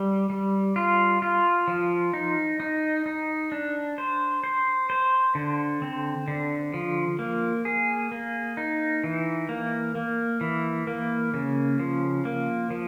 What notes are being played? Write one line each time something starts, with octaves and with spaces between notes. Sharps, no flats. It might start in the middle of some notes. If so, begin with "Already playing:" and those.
Already playing: G3
G3
F4
F4
F3
D#4
D#4
D#4
D4
C5
C5
C5
D3
C4
D3
F3
A#3
G#4
A#3
D#4
E3
A#3
A#3
E3
A#3
C#3
F3
A#3
F3